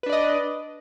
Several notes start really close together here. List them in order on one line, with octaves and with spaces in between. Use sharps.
B4 D4 D5 D#5